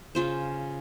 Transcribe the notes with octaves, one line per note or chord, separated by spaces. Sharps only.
C#3 F4 C5